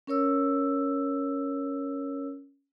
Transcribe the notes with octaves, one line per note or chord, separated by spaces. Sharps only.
C#4 A#4 C#5 E6